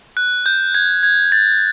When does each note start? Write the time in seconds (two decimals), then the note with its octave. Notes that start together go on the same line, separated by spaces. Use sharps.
0.17 F#6
0.46 G6
0.75 G#6
1.03 G#6
1.32 A6